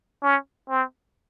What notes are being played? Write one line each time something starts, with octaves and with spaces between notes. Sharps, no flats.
C#4
C4